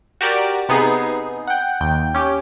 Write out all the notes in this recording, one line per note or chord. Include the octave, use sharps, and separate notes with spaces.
F#4 G4 A#4 D5
C3 B3 D#4 G#4 C7
F#5 G5
D#2 G5
C#4 G4